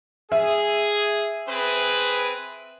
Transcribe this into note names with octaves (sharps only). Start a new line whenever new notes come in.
G#4 E5
C4 G#4 B4